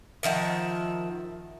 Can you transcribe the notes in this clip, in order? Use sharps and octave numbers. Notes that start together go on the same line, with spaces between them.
D#3 F3 E5 F#5